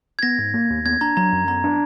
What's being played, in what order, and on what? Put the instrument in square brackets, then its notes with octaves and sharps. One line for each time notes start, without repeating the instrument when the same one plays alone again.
[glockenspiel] G#6
[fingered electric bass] B3 [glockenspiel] A#6
[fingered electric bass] G#2
A#3
D#2
[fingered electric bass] B3 [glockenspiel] G#6
[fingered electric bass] D4 [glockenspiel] A#5
[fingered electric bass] F#3 [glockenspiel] A#5
[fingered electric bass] F#2
[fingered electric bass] B3 [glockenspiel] A#5
[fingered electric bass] D4